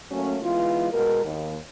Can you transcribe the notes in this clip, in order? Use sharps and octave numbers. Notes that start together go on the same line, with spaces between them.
F#3 A3 A#3 C#4
E3 G#3 B3 F4
B2 G#3 A#4
D#2